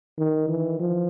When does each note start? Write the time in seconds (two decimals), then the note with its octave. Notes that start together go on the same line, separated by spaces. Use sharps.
0.19 D#3
0.49 E3
0.80 F3